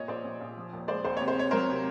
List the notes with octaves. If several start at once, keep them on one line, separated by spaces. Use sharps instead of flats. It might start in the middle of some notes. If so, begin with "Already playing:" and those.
Already playing: A#2 C#5 D#5
A#1 C5 D5
A#1
A#1
F3
D#2
G#3 C5 D5
D#2 C5
C3 C#5
C5
C3 C#5
F#3 A#4 C5
C3